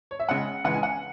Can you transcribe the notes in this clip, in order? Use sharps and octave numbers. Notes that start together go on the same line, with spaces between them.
C#5
E5
C#3 G#3 F#5
C#3 E3 G#3 F#5
G#5
F#5